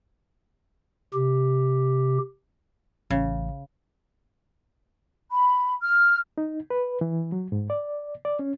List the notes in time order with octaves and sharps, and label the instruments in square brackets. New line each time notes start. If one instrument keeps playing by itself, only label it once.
[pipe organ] C3 G4
[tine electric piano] A1 [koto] C#3
[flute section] B5
F6
[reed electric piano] D#4
B4
E3
F#3
G#2
D5
D5
C#4